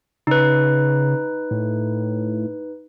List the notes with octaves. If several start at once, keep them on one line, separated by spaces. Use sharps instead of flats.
C#3 D#4 B4
A2